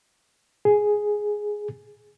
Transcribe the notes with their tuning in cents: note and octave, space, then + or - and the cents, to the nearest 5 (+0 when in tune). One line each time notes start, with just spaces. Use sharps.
G#4 +5